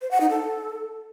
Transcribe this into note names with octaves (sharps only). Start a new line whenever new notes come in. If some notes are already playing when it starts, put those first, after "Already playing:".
C5
F#5
D#4
A4